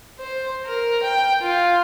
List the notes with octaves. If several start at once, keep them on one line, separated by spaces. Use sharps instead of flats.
C5
A#4
G5
F4